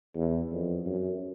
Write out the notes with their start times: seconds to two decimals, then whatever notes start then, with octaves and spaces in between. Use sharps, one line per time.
0.15 E2
0.51 F2
0.86 F#2